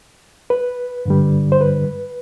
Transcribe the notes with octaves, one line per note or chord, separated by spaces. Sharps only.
B4
G2 D3 G3
C5
B4